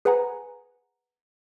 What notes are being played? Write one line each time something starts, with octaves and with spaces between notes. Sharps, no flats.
G#4 B4 C5 F#5 G#5 A#5